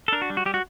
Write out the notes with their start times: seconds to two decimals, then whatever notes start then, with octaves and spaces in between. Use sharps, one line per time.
0.08 A4
0.12 D4 A#4
0.22 F#4
0.30 G3
0.37 F#4
0.46 G3 G4
0.54 F#4